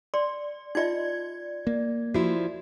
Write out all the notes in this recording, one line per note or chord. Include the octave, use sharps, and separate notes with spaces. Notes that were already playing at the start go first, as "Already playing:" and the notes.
D5 C6
D#4 F4 D5 D#5 G#6
A#3
F3 E4 F#4